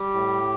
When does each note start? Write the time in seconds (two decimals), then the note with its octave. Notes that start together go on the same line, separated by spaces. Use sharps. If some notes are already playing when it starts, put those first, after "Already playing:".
Already playing: G3 G4
0.14 A2